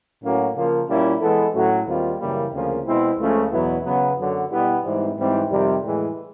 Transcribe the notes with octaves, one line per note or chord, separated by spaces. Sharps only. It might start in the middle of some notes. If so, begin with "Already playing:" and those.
A2 F#3 A#3 C#4 F#4
C#3 F3 A#3
A#2 G3 A#3 C#4 E4
E3 G#3 B3 E4 A4
A2 F#3 A3 C#4 F#4
D#2 D#3 G3 C4 F4
F#2 C#3 E3 G3 A#3
D2 C#3 F3 A#3
B2 G#3 C4 E4
C#2 C#3 F3 A3 C#4
E2 B2 F#3 B3 E4
C#3 F#3 B3
F#2 D3 F#3
B2 G3 B3 E4 G4
G#2 E3 G3 C4
G#2 E3 G3 C4
F2 C3 D#3 G3
A2 E3 G#3